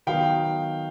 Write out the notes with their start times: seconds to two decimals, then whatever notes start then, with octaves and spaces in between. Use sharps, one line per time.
0.07 D#3 F#3 B3 D#4 F5 G5